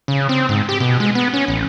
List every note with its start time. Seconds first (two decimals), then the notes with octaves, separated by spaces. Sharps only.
0.08 C#3
0.29 C4
0.49 G#2
0.69 G4
0.80 B2
1.00 G#3
1.15 B3
1.34 C#4
1.48 A1